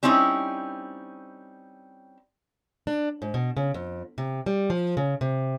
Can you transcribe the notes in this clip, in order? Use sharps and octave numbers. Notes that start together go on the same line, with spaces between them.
G3 C4 C#4 D#4 E4
D4
G#2
B2
C#3
F2
C3
G3
F3
C#3
C3